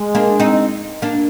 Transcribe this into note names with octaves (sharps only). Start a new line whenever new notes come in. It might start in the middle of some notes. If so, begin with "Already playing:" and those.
Already playing: G#3
A#3 D4
C4 D#4
A#3 D4